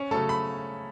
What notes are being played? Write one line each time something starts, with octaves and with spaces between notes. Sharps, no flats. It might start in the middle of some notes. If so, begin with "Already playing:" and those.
Already playing: C#4 C#5
C#3 F#3 A3 A4 A5
B5